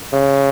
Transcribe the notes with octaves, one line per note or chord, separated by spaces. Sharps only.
C#3